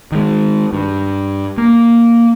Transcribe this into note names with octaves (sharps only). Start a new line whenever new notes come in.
D#3 G#3
G2
A#3